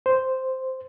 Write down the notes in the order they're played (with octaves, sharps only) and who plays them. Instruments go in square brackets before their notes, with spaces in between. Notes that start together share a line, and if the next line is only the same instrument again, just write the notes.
[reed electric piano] C5